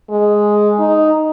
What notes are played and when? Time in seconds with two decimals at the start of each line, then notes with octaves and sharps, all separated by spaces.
0.10 G#3
0.79 D#4